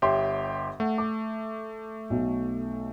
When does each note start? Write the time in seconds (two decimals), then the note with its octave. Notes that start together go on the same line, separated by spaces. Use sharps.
0.02 G1 G4 C#5 E5 C6
0.80 A3 F#5
0.98 D6
2.10 B1